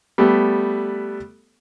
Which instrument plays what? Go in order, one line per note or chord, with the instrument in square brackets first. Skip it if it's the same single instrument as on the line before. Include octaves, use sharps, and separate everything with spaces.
[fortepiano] G3 A3 B3 A4